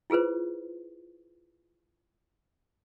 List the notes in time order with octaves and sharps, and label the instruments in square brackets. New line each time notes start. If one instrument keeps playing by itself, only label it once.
[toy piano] E4 F4 G#4 B4 C5